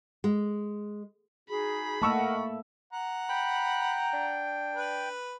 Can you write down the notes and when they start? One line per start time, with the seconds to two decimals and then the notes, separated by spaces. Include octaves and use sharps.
0.24 G#3
1.49 D#4 F#4 G#4 B5
2.02 A3 A#3 A#4 D#5 F#5 A5 C#6 E6
2.93 F#5 A#5
3.29 G5 B5
4.13 D4
4.75 B4